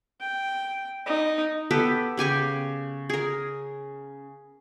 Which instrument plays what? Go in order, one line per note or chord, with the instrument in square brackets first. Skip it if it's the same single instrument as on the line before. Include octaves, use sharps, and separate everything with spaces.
[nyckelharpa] G5
D#4
[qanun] B3 G4 A4 B4
C#3 G4 G#5 C#6
G#4 A#4